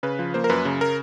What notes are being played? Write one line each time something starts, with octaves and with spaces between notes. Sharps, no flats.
C#3 B4
F3
A#3 C5
A#4
F#2 B4
C#3
A#4